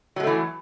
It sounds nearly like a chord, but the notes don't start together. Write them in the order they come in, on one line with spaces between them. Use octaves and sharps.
F#3 G#3 A3 E3